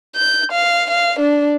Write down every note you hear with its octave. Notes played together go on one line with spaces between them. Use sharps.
G6
F5
F5
D4